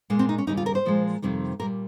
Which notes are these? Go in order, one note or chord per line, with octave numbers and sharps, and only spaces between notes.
A#2 G#3 A#3
C4
D#4
C#4
D#2 C#3 G3 D#4
F4
A#4
C5
A#2 F3 G#3
F2 C3 D#3 G3
A#2 G3 A#4